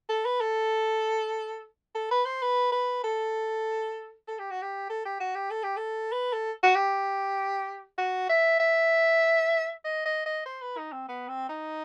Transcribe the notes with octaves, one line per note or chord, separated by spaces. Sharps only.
A4
B4
A4
A4
B4
C5
B4
B4
A4
A4
G4
F#4
G4
A4
G4
F#4
G4
A4
G4
A4
B4
A4
F#4
G4
F#4
E5
E5
D#5
D#5
D#5
C5
B4
D#4
C4
B3
C4
D#4